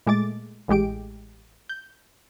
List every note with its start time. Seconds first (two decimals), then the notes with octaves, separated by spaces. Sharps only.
0.07 A#2 G#3 A3 D6 A6
0.68 A1 A2 G#3 G4 D7
1.69 G6